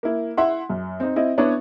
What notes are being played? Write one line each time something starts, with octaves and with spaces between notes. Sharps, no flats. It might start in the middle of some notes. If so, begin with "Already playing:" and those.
A#3 E4
E4 E5 F#5 C6
F#2
C4 D#4
C4 E4 D#5
B3 D4 E4 C#5